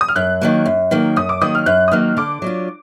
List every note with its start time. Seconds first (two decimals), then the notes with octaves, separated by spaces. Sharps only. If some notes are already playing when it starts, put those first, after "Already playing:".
0.01 D#6
0.09 F6
0.16 F#2 F#6
0.41 D#3 F#3 A#3
0.66 F#2
0.91 D#3 F#3 A#3
1.16 F#2 D#6
1.29 D6
1.41 D#3 F#3 A#3 D#6
1.55 F6
1.66 F#2 F#6
1.88 D#6
1.91 D#3 F#3 A#3 F6
2.17 D3 D6
2.42 F#3 D4 F4